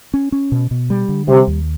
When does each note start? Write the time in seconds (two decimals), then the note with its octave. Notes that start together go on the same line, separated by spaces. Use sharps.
0.14 C#4
0.32 C#4
0.52 B2
0.71 B2
0.90 G3
1.09 D3
1.28 C3 G3
1.48 D#2